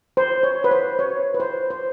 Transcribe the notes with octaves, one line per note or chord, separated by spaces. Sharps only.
C5
C#5
B4
C5
C#5
B4
C5
C5